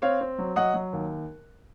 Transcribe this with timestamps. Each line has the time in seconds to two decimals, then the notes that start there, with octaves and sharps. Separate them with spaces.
0.02 C4 C#5 F5
0.21 C4
0.38 F#3
0.56 F#3 D#5 F#5
0.74 F#3
0.93 D#2